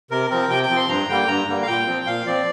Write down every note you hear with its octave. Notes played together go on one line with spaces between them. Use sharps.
C3 A#4
F3 C4 A#4
C3 G5
G5
F3 C4
C6
G2 A#5
D3 G3 A#3 G5
G2 A#5
D3 G3 A#3
F5
A#2 G5
F3 C4
A#2 F5
F3 C4 D5